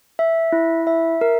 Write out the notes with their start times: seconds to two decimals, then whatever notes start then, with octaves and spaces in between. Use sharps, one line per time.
0.19 E5
0.52 E4
0.87 E5
1.21 A#4